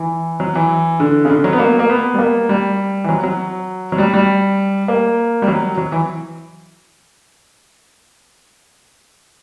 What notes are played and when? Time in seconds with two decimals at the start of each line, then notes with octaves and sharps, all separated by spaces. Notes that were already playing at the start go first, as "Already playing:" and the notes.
Already playing: E3
0.40 F#3
0.55 E3
1.00 D3
1.25 C#3
1.30 D3
1.44 F#3
1.53 B3
1.59 A#3
1.79 A#3
1.90 B3
2.14 G3
2.19 A#3
2.49 G3
3.04 E3
3.09 F#3
3.24 F#3
3.92 F#3
3.98 G3
4.14 G3
4.88 A#3
5.42 G3
5.48 F#3
5.78 F#3
5.92 E3